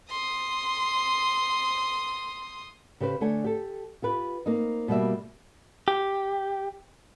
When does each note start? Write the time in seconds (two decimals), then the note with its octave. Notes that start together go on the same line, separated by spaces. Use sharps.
0.10 C6 D#6
3.01 C#3 G4 B4 C5
3.21 D3 A3 C#5 G#5
3.44 G4 A4
4.02 F4 G4 B4
4.46 A#3 C4 D#4
4.88 B2 G3 A#3 E5
5.88 G4